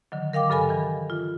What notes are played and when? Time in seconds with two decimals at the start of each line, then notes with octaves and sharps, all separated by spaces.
0.12 D3 D#3 F#3
0.33 A#4 F5 G5 D6
0.50 G2 C#3 A4 A#4 G#5 B5
0.69 D#3 E3
1.10 F4